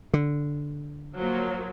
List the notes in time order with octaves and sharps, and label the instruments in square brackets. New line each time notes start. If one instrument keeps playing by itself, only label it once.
[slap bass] D3
[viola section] F3 F#3 A#3